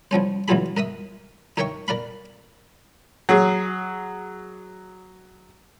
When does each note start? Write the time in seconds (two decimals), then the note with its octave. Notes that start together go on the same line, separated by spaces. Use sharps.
0.11 C2 F3 C#4 C5
0.48 C#2 E3 F#3 F4 G#4 B5
0.77 A#4 D#5 E5 D#6
1.57 D#4 A#4 C#5 E5 G5 C#6
1.88 A#4 D5 F5 B5
3.29 F#3 G#4